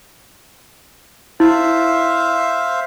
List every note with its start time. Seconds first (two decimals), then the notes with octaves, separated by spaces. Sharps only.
1.40 E4 C5 E5 F5